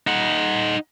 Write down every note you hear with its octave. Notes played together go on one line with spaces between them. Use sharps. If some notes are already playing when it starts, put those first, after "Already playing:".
D#4 F#5